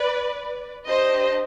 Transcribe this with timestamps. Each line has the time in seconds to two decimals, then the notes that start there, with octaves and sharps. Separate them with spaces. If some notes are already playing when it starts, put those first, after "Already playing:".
Already playing: B4 D5
0.87 D4 G4 C5 D#5